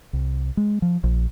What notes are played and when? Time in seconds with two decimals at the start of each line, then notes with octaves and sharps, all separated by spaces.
0.13 C2
0.57 G#3
0.82 F3
1.04 A#1